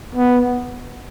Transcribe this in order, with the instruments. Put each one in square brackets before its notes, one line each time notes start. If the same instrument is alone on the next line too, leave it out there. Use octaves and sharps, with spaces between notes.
[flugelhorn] B3